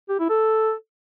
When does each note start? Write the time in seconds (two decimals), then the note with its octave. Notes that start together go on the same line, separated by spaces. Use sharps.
0.09 G4
0.19 E4
0.30 A4